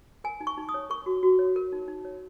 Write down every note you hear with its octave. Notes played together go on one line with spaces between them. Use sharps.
A#4 G#5
D#4
C#6
D#4
D#6
C#5
A#4 C#6
F#4
F#4
C#5
A#4
D#4
D#4
C#5